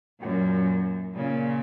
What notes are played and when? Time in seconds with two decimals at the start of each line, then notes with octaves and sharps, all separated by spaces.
0.21 F#2 A#2
1.16 A#2 C#3